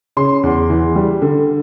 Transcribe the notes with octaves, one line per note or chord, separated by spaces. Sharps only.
C#3 C6
E2
E3
G3
D3